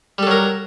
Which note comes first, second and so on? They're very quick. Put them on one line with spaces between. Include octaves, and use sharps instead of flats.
G3 A4 F#3 A#4